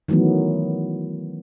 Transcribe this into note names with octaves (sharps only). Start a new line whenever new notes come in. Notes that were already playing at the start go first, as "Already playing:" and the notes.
D#3 E3 F#3 A3 B3